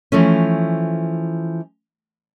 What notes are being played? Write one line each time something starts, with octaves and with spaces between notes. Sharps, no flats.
E3 F3 A3 C#4